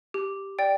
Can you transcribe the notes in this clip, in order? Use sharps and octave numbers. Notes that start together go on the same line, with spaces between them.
G4
D5 G5